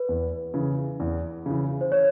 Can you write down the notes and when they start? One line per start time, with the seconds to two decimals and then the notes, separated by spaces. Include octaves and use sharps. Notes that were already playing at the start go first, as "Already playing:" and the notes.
Already playing: B4
0.09 E2
0.54 C#3 E3
1.00 E2
1.46 C#3 E3
1.81 C5
1.92 C#5